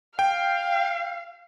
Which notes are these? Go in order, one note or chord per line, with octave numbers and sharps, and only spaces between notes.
F5 G5